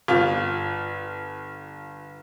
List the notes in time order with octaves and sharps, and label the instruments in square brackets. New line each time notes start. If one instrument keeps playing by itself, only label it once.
[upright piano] G1 F4